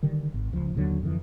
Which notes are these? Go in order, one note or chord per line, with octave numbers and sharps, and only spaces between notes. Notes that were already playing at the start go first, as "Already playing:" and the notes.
D3 D#3 G3
G#1
C#2 F3
D#2 B2 D3 F#3
F2 D3 E3